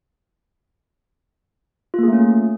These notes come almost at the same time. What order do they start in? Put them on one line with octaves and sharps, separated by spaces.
F4 A#3 G#4 A3 C#4